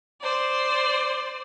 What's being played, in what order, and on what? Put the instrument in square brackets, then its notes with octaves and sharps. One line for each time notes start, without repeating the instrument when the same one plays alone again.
[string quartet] C5 D5